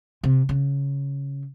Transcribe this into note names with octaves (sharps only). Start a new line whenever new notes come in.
C3
C#3